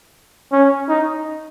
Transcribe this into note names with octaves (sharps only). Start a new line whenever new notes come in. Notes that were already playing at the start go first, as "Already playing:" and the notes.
C#4
D#4